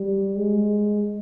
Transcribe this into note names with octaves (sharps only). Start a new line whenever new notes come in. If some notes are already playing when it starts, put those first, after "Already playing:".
Already playing: G3
G#3